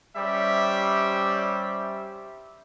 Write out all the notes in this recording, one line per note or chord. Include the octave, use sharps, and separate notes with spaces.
G3 C#4 G4 C5 E5